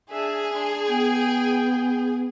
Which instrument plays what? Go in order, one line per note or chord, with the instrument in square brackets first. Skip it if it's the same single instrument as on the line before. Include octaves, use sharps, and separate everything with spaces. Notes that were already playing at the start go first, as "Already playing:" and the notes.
[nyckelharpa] D4 E5 [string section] G#4
[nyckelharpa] D4 C6
[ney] B3 [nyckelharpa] G5